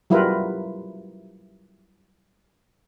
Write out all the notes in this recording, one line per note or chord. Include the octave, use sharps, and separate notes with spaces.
F#3 G3 E4 F4 A#4 B4